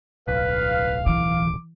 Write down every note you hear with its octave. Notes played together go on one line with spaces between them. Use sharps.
D1 B1 B4 F5
E3 D6